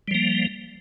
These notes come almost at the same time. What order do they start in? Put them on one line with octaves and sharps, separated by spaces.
G3 F3 A#3